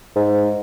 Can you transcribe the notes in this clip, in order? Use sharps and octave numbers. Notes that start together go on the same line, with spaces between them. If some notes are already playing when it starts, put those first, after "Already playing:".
G#2